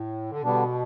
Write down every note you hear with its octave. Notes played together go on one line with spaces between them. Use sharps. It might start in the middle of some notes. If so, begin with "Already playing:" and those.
Already playing: A2
D3
B2 D3 G3 B3 D4